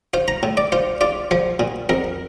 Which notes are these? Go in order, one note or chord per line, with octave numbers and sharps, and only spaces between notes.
F4 C5
A#5
A2
D5
F4 C5
F4 D5
F3 C5
A#2
F2 A#4